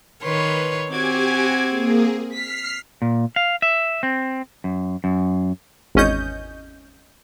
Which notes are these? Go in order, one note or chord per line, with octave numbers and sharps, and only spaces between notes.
D#3 B4 C#5 C6
C4 F#4 G4 G#5 D6 G#6
A#3 G#4
F6 B6 C7
A#2
F5
E5
C4
F#2
F#2
G#1 E2 C#4 D#5 G6